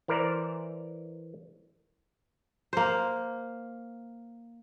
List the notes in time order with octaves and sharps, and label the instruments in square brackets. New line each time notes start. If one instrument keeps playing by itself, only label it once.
[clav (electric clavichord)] E3 A#4 C5 D5 A#5
[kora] A#3 C5